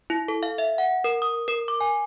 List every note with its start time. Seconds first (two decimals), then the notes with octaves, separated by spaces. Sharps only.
0.10 E4
0.28 A4
0.43 F5
0.58 E5
0.78 F#5
1.04 A#4
1.22 D#6
1.48 A#4
1.68 D6
1.81 G#5